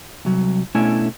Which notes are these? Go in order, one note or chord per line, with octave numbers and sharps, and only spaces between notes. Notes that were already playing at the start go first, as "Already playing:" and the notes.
C2 F#3
B2 A3 C#4 D4 E4 G#5